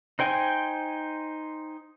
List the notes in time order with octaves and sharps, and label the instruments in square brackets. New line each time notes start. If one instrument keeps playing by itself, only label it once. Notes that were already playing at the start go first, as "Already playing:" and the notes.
[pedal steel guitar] D#4 C5 G5 G#5